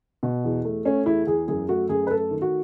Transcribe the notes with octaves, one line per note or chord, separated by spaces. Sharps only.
B2
E2
A3
A3 C#4
E2 E4
E2 G#4
F#2 G#4
A3 F#4
F#2 G#4
B4
A3 A4
D#3
F#4